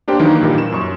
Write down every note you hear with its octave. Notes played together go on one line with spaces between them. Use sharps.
A#3 D4 G4 A#4 C5 G5
D#3 E3 F#3 A#3 D#4
G2 A#2 D#3 G3
E7
F#2 C#6